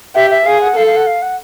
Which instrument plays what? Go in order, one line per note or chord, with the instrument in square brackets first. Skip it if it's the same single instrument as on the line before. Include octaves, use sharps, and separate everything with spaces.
[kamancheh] G4 [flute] E5
[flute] E5
[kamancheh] G#4 [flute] F5
[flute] F#5
[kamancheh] A4 [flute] F5
[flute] F5
F#5
F5
F#5